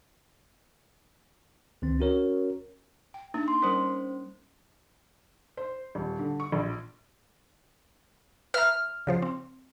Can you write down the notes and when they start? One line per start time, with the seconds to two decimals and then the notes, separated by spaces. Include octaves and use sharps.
1.82 C#2 D#3 C4
1.99 C#4 F#4 A#4 C#5
3.14 G5
3.34 A#3 D4 D#4
3.48 C6
3.62 G3 C#4 A#4 C5
5.57 C5
5.95 D#1
6.19 D3
6.40 C#6
6.52 A#1
8.54 B4 E5 A#5 F6
9.07 C#3 F3 C5
9.22 C4